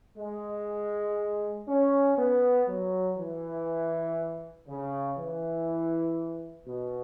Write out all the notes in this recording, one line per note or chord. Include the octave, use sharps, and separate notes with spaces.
G#3
C#4
B3
F#3
E3
C#3
E3
B2